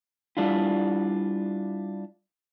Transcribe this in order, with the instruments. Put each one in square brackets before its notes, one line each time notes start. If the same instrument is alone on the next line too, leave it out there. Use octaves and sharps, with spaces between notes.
[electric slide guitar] G3 D4 E4 F4